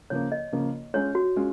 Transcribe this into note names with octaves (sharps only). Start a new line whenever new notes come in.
C#3 F3 A#3 C#5
D#5
C#3 F3 A#3
G#3 C#4 F4 C#5
F#4
G#3 C#4 F4